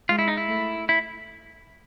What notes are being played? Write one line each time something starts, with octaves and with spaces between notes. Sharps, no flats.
G#3 F4
E4
D#4
E4
A3
E4